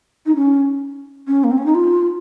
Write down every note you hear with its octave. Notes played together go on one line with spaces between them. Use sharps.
D#4
C#4
C#4
A#3
C4
C#4
D#4
F4